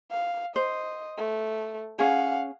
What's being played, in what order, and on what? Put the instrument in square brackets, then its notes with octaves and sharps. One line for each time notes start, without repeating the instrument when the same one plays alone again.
[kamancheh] F5
[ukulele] C5 [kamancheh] D#5
[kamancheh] A3
[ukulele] C#4 G#4 [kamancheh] F5 F#5